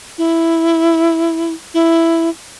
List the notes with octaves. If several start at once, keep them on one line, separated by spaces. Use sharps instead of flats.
E4
E4